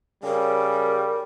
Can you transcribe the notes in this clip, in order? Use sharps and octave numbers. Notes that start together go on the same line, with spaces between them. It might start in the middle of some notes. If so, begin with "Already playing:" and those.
C#3 G3 A#4